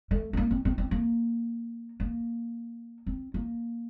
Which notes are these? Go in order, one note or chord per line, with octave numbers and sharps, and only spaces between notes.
A3
C4
A#3
C4
C4
C4
A#3
A#3
C4
A#3